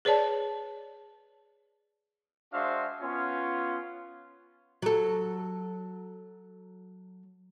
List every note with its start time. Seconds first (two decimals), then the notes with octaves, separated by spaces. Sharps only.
0.05 G#4 B4 C#5 D5 A5
2.53 G#3 D4 F#4 C5 E5 F5
3.01 B3 C#4 F4
4.82 F#3 A4